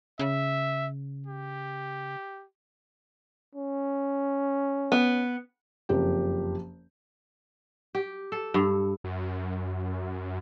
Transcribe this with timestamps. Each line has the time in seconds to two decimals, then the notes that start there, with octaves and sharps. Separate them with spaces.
0.19 C#3 E5
1.26 G4
3.55 C#4
4.92 B3
5.89 F#1 F2 G4
7.95 G4
8.32 A4
8.54 G2
9.04 F#2